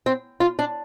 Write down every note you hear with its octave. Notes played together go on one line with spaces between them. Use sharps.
C4
F4
D4